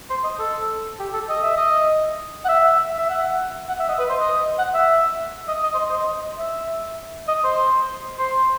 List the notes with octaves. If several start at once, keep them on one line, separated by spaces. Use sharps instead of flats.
C5
D#5
A4
G4
A4
D#5
E5
D#5
F#5
E5
E5
F#5
F#5
E5
D#5
B4
C5
D#5
F#5
E5
D#5
D#5
C5
D#5
C5
D#5
E5
D#5
C5
C5